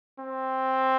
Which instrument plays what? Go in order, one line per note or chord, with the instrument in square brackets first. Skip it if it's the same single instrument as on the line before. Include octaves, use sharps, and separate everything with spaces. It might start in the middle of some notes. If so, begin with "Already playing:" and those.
[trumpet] C4